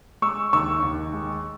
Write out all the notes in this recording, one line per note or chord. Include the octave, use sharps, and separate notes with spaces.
G#3 C#6 E6
D#2 C#6 E6
D#2
G#3